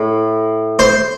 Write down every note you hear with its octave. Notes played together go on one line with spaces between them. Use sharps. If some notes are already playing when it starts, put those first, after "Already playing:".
Already playing: A2
C5